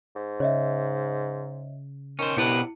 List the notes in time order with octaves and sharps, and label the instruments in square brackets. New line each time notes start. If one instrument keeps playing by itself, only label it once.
[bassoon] G#2
[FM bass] C#3 [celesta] C#5 D#5 E5
[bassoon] D#3 [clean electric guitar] C#4 C5
[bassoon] C2 [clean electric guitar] B2 G4 B4 [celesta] E4 C#7